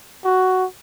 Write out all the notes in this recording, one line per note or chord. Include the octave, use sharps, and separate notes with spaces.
F#4